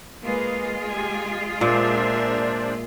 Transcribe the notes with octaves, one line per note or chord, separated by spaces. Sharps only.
G#3 A#3 F4 G#4 B4
G4 G#5
A#2 D4 A#4 C5 D5 E5